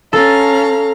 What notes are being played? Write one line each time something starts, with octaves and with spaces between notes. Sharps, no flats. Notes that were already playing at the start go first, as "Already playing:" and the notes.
C#4 A4 F5 A#5